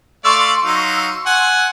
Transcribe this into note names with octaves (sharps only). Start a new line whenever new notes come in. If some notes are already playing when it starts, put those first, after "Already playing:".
A3 D5 F5 C6 C#6 E6
F#3 D#4 F5
F#5 G#5